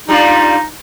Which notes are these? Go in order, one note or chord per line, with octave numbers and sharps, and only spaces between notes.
G3 D4 D#4 F4